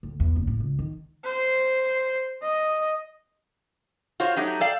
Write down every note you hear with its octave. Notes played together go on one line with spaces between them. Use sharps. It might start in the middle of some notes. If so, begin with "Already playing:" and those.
D2
E2
F#1
A2
C#2
D#3
C5
D#5
F4 F#4 C5 C#5
F#3 A3 D#4 G4
A4 D5 F5 G5